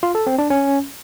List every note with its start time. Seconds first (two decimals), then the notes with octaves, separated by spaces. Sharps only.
0.03 F4
0.15 A4
0.27 C4
0.38 D4
0.50 C#4